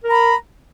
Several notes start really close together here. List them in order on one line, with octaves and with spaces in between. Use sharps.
A#4 A#5 B5